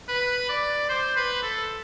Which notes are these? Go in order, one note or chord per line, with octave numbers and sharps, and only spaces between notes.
B4
D5
C5
B4
A4